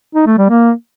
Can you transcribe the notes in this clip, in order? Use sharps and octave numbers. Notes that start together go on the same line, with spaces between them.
D#4
A3
G3
A#3